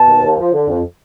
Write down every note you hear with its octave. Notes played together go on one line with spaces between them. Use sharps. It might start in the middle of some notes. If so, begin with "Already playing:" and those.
Already playing: B2 A5
D#2
D#2
F3
D3
F2